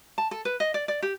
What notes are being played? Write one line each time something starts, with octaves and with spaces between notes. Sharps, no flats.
A5
A4
B4
D#5
D5
D5
G4